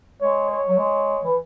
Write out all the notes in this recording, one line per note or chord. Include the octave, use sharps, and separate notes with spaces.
G#3 C#5
C#5
F#3
G#3
E3